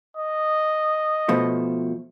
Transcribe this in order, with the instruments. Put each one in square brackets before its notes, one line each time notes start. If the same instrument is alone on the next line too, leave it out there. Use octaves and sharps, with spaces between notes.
[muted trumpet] D#5
[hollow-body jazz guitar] B2 F3 A3